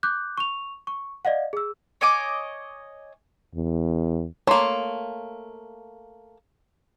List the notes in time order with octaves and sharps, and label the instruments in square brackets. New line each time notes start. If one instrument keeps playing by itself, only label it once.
[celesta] D6 F#6 G6
C#6 F7
C#6
D5 D#5 F5 F#5
G#4 E6
[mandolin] C#5 D#5 G#5 D6
[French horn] E2
[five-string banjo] A3 A#3 [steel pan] C#5 C6